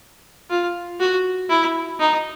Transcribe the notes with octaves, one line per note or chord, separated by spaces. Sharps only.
F4
F#4
E4
D#4